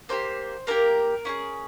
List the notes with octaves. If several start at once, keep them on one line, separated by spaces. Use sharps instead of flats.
A#3 D4 G4 C5
A#3 D4 G4 A#4
C#4 E4 G#4